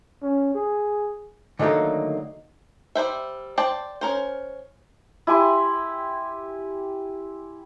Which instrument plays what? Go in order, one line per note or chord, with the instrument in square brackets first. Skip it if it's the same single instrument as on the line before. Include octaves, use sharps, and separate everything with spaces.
[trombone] C#4
G#4
[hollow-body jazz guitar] D3 D#3 F#3 A3 A#3
[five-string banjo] G3 B4 C5 E5
C5 D5 G5 A5
C#4 A#4 C5
[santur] E4 G4 G#5 C6